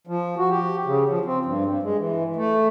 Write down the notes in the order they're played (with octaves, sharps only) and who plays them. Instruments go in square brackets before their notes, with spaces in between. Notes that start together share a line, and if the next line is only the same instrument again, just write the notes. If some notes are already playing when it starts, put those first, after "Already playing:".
[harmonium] F3
F#4
G4
C#3
F3
C4
G2
G2
G#3
E3
A3